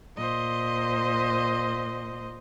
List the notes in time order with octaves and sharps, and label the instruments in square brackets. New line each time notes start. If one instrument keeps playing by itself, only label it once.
[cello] A#2 [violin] C5 D#5